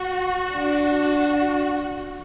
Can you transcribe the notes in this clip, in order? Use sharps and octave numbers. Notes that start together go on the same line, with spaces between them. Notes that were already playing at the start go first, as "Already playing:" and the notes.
Already playing: F#4
D4